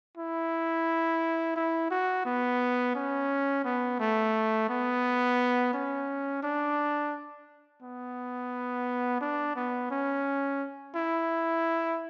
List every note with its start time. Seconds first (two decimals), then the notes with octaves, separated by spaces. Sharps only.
0.17 E4
1.56 E4
1.91 F#4
2.25 B3
2.95 C#4
3.65 B3
4.00 A3
4.69 B3
5.73 C#4
6.43 D4
7.82 B3
9.21 D4
9.56 B3
9.90 C#4
10.95 E4